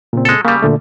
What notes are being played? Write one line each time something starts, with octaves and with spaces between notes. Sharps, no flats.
A#2 C#3 C4
G#3 A4
C#3 G3 A#3
A#2 D3 A3